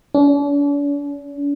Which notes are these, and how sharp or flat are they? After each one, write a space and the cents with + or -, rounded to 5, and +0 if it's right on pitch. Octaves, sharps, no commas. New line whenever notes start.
D4 -45